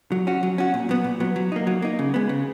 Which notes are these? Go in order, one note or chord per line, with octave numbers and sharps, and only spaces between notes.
F#3
C#4 F#4
F#3
C#4 F#4
A#2
F#3 B3
A#2
F#3 B3
F#3
A#3 D#4
F#3
A#3 D#4
C#3
G#3 B3
C#3